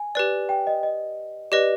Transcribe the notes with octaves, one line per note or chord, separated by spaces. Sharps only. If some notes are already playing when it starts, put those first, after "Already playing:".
Already playing: G#5
G4 B4 D5
G5
D#5
D#5
G4 B4 D5 D#5